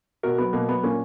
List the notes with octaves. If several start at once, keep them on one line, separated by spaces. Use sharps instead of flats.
B2 F#4 A#4
F#3 B3
B2 A#3
F#3 B3
A#2 A#3 C#4